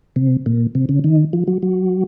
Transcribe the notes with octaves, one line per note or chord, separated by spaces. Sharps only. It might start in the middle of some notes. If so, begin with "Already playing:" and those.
C3
A#2
C3
C#3
D#3
F3
F#3
F#3